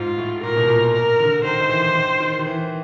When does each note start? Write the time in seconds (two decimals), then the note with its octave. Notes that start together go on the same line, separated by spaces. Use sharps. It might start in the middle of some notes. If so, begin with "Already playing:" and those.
Already playing: G#2 F4
0.18 A2
0.43 A#2 A#4
0.56 B2
0.69 A#2
0.94 A#4
1.20 D3
1.44 D#3 C5
1.60 D#3
1.69 E3
1.95 D#3
2.20 D#3
2.39 D#3
2.46 E3